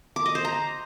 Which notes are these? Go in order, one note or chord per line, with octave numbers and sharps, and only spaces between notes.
D6
D#5
C5
A#5